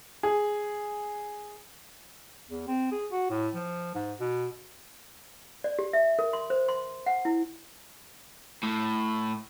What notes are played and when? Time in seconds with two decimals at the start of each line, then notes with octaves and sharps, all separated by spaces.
0.23 G#4
2.50 E2
2.68 C4
2.92 G#4
3.12 F#4
3.30 A2
3.54 F3
3.95 G#2
4.20 B2
5.64 D5
5.79 G4
5.93 E5
6.19 A#4
6.33 C6
6.50 C5
6.69 C6
7.06 F#5
7.25 E4
8.63 A2